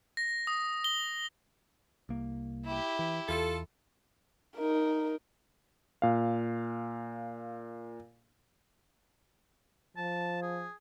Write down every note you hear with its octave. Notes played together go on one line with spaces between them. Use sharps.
A#6
D#6
G7
C2 A#3
E4 G4
E3
E2 F4 A4
D#4 A#4
A#2 F5
F3 A5
G#4